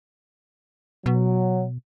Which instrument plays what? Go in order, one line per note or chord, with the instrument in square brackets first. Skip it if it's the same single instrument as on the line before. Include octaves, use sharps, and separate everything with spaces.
[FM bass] B2 [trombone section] F#3